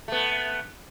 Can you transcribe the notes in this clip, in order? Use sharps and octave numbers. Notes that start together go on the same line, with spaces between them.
A3 B3